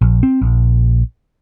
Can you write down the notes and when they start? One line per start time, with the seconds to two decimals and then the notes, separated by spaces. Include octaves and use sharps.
0.01 A#1
0.23 C4
0.42 A#1